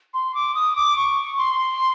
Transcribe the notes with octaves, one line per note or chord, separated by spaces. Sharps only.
C6
D6
D#6
D6
C#6
C6